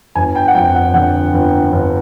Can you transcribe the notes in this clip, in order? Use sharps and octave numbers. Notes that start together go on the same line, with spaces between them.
G1 G#5
G5
F#5
F2 G5
F#5
D3 F#5
G1
G1